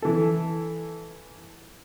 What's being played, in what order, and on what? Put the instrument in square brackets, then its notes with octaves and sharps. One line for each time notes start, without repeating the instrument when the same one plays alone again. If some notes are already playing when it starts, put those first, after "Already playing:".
[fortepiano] E3 A4